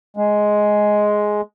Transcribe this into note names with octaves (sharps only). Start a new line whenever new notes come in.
G#3